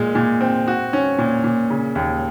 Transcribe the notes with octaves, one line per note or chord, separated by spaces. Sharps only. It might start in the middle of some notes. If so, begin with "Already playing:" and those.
Already playing: A#2 G#3
A#2
C4
F#4
C#4
A#2
A#2
C#3
D#2